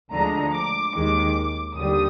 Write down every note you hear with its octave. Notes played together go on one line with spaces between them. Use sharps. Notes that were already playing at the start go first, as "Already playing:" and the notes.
D2 D3 F3 G#3 A#5
D6
D#2 D#3 G#3 D6
D#2 D3 G3 D#6